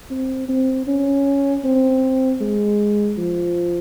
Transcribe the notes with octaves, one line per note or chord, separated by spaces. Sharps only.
C4
C4
C#4
C4
G#3
F3